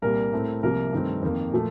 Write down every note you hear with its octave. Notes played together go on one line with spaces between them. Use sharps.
C2 A#2 G3 A#3 A#4
A2 A3 C4
C2 C3 F3 A#3 A#4
G2 D#3 A3 C4
F2 D#3 A#3
A#2 F3 A3